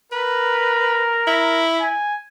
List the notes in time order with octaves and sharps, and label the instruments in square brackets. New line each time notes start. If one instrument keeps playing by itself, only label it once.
[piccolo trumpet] A#4 [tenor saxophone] B4
[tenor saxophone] E4
[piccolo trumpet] G#5